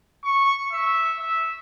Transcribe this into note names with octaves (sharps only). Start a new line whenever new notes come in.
C#6
E5
E5